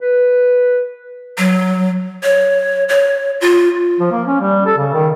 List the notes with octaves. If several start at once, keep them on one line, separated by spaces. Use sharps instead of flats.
B4
F#3
C#5
C#5
F4
F3
A#3
C#4
G3
A4
C#3
D#3